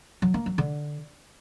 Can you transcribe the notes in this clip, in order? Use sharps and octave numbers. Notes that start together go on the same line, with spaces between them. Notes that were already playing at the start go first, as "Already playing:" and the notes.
F#3
A#3
F#3
D3